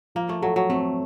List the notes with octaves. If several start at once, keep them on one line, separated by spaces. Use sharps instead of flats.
F3 A#3
A3
F#3 A4
F#3
A3 C4